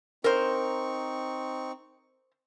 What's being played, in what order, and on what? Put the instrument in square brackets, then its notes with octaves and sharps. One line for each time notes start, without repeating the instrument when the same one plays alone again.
[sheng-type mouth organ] C4 D#4 C#6 [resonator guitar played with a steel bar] A#4 C5